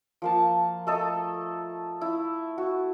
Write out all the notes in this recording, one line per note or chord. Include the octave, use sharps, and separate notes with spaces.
F3 A#3 A5
A3 A4 D#5
E4
F#4